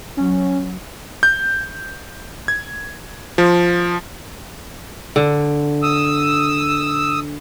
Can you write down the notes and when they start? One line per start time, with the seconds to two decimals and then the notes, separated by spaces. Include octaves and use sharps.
0.17 F#3 C#4
1.23 G6
2.48 G#6
3.38 F3
5.16 D3
5.83 D#6 E6